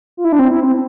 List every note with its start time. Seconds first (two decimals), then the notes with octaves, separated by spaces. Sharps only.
0.17 F4
0.25 E4
0.32 D4
0.39 C4
0.51 E4
0.64 C4